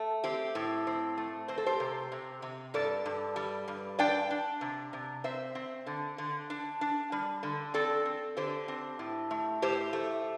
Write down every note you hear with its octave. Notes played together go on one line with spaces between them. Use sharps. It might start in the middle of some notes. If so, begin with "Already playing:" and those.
Already playing: A3
C4 G4
A2
C4
A3
C4 C5
A4
G4 C5
C3
C3
C3
G2 A4 D5
G2
G3
G2
D4 D5 G5
D4
C3
C3
C4 C5 E5
C4
D3
D3
D4
D4
G3
D3
C4 A4 D5
C4
D3 G4 C5
C4
A2
A3
A2 G4 C5
A3